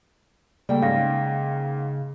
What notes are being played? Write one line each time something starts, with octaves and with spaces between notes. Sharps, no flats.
C#3 G3 A3 A#3 D5 G5
G#2 C#4 F5 A#6